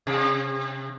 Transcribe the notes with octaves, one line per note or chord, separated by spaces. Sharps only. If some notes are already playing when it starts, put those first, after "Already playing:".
C3